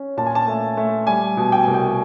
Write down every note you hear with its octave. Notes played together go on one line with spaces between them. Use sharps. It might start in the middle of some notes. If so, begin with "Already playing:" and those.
Already playing: C#4
A#2 A5
G#5
A5
A3
A3
G3 G#5
B2
G5
C2 G#5
G5